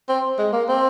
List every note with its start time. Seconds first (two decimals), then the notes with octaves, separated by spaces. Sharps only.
0.09 C4
0.38 G#3
0.53 A#3
0.68 C4